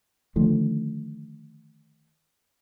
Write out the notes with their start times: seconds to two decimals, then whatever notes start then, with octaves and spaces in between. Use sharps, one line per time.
0.36 D3 D#3 F3 A3